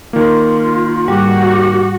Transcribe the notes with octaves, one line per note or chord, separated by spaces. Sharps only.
D#3 A#3 F4
G#2 G3 F#4 G4